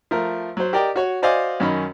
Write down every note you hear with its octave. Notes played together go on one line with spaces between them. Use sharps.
F3 A3 A#4
F#3 C5
G4 A#4 D5 D#5 G5
F#4 C#5
F#4 C5 D5 D#5 F5 G#5
F#2 D#3 C#4 D#5 B5